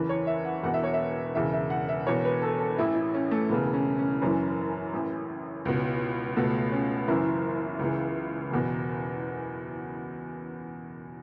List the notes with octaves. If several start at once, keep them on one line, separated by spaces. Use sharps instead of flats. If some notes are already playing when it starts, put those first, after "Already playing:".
Already playing: F#1 E2 E3 B4
C#5
E5
F#5
E1 E2 B2 F#5
E5
C#5
E5
E1 E2 C#3 E5
E5
F#5
E5
E1 E2 B2 C#5
B4
A4
A4
A1 A2 E3 E4
E4
C#4
A3
E1 E2 C#3 B3
C#4
C#4
F#1 F#2 E3 C#4
A1 A2 E3
C#2 B2
C#2 B2 A3
C#4
F#1 F#2 E3 E4
C#2 C#3 E3
F#1 E2 B2